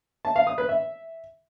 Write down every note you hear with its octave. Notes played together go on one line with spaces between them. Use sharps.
A5
F5
D#6
B4
E5